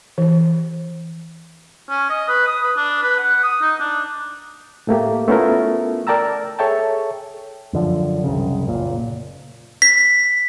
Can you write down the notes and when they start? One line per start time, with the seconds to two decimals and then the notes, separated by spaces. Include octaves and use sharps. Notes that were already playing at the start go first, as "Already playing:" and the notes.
0.18 E3
1.90 C#4
2.10 D#5
2.29 B4
2.47 D#6
2.62 B4
2.77 D4
3.02 B4
3.19 F#5
3.43 D#6
3.62 D#4
3.80 D4
4.87 A2 A3 A#3 G4
5.28 A3 B3 C#4 E4 F4 A#4
6.07 A#4 D5 G5 A5 A#5 E6
6.59 G#4 A4 C#5 E5 G5 A5
7.73 F#2 D3 F3
8.24 C2 F#2 C#3
8.67 F#1 A#2
9.82 B6